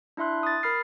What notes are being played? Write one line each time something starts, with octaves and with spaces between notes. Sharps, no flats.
D4 E4 E5 C6 F#6
D#6 A6
A#4 B5 F6 C7